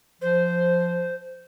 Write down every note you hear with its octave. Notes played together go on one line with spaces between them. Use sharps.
F3 C5